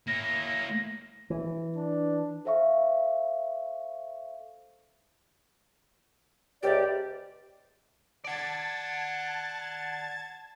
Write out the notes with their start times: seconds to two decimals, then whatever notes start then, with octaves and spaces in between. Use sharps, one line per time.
0.08 A#3 E4 A#6
1.30 E3
1.76 D4
2.45 A4 C5 E5 F5 C#6
6.63 C#2 C3 G4 D5
8.24 D5 F#5 A5 G#6 A6